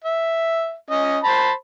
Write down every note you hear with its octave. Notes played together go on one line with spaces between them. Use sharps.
E5
C#4 D#5
C5 A5 B5